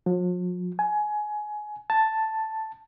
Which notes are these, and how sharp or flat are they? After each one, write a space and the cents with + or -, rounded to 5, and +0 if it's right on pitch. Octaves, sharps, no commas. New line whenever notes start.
F3 +45
G#5 +20
A5 +0